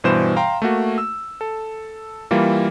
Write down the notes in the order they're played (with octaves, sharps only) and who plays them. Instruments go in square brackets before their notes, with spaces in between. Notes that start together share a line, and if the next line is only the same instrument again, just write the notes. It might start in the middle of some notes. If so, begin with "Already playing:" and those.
[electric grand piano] G2 B2 E3 G3 C5 E7
F5 G5 A#5 C6
A3 A#3 F#4
E6
A4
E3 G3 A#3 F4